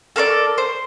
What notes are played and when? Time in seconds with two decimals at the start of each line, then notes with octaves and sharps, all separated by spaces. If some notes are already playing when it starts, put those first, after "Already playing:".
0.16 A4 A#4 C5 D5
0.58 C5